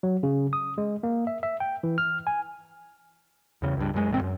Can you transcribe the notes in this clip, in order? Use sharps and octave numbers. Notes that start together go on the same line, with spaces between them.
F#3
C#3
D#6
G#3
A#3
E5
E5
G5
E3
F6
G#5
E2 C#3
C#2 G2
F#2 F3 G#3
E1 A1 G#2 C4
F#2